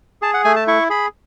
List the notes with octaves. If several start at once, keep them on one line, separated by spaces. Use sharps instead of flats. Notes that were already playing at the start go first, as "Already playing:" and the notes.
G#4 A5
F#5
A3 G#5
A5
E4 C#6
G#4 B5